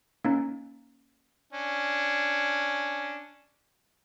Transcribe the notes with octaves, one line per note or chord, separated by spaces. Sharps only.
A#3 C#4 D#4
C#4 D4